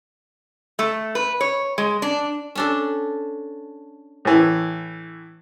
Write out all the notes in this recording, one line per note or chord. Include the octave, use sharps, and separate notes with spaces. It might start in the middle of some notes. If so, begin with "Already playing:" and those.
A3
B4
C#5
G#3
D4
C#4 D4 A4
A2 E3